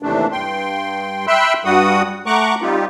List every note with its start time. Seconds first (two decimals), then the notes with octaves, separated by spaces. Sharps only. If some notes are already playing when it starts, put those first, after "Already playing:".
0.03 D#2 C3 E3 A3 D4
0.32 G2 G5 C6
1.27 E5 G5 B5 C6 E6 F#6
1.65 G2 G3 F#4 F#5 D#6
2.26 A3 F#5 A#5 C#6 D6 F#6
2.62 G3 C4 D#4 F4 G4